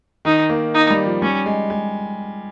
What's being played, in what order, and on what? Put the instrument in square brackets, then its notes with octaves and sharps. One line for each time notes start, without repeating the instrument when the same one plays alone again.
[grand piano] D#3 [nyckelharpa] D#4
[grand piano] A#3
[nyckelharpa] D#4
[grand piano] G3
F3
[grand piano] G3 [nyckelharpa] C#4
[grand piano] G#3
G#3